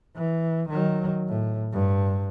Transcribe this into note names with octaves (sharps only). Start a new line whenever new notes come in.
E3
D#3 F#3
A2
G2